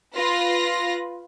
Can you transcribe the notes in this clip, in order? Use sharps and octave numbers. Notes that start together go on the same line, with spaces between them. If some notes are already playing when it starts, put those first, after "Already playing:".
F4 B4 A#6